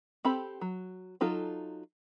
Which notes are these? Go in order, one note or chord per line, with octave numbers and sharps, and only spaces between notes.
C4 G4 A4 B5
F#3
F#3 D#4 F4 A4